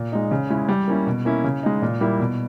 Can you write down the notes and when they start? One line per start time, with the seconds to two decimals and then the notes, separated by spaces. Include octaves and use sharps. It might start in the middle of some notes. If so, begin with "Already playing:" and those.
Already playing: A#2
0.12 G#3 D#4
0.31 C#3
0.50 G#3 C#4 E4
0.69 G3
0.88 A#3 C#4 E4
1.07 B2
1.25 A#3 C#4 E4
1.44 C#3
1.63 G#3 D#4
1.82 A#2
2.01 G3 A#3 E4
2.20 B2